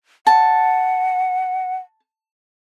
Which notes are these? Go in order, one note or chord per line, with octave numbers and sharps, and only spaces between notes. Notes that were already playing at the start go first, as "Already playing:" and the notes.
F#5 A5